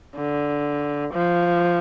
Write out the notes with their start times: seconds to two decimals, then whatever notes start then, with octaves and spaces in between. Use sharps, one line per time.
0.16 D3
1.14 F3